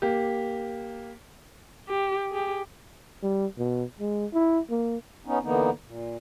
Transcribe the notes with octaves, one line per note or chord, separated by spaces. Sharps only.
A#3 G4
G4
G4 G#4
G3
B2
G#3
E4
A#3
B3 C#4 D#4
D3 E3 A#3 B3 D#4
A#2